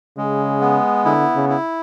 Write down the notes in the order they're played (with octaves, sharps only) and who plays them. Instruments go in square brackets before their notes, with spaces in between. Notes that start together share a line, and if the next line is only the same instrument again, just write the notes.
[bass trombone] C#3 [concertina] G#3
[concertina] B3
[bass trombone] D3 [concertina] E4
[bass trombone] C#3
[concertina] E4